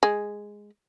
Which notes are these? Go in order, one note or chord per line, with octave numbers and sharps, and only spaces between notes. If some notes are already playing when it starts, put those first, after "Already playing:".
G#3